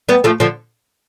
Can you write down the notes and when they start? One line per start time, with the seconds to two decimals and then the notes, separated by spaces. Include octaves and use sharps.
0.09 G3 B3
0.24 F3 A3
0.40 D3 F3